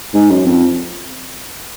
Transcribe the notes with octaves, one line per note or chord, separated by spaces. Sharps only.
G#2
F#2
F2